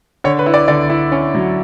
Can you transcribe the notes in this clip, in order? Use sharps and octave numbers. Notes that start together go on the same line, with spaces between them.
D3 C#5
B4
E4
D5
D3 D5
E4
C#4
F#3